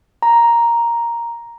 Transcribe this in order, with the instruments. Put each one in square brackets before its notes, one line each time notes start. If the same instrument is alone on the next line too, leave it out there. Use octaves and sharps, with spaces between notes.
[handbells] A#5